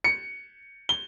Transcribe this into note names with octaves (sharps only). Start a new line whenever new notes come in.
C#7
G7